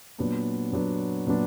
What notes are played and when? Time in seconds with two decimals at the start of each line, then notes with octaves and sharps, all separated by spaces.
0.18 A#2 F#3 B3 D4
0.72 A#2 F#3 B3 D4
1.27 A#2 F#3 B3 D4